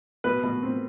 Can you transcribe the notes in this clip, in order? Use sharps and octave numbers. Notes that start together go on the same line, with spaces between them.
B2 B4
B2
C4